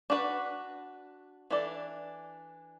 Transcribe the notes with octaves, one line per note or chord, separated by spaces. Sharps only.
D4 F#4 B4
E3 D4 A4 D5